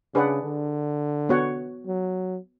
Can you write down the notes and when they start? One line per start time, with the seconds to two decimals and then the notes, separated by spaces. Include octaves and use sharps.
0.14 C#3 D4 G#4 B4 D5 F#5
0.43 D3
1.29 B3 F#4 C#5 F#5
1.86 F#3